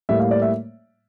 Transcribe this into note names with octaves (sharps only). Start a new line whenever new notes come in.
A2 G3 A#3 E5
F5
D5
E5